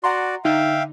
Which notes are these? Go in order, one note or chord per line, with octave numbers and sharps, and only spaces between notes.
F#4 D5 F#5 A#5 C6
D3 D#4 E5 F5 G5